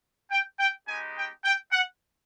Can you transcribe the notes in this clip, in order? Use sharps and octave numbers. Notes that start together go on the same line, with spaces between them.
G5
G5
G#3 B3 D#4 G4 G#5
G5
G5
F#5